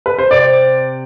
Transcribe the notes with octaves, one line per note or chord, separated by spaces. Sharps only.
B4
C5
C3 D5